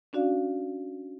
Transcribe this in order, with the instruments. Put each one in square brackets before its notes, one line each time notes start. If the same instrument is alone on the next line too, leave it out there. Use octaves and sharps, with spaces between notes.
[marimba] C#4 D4 F#4 D5 F5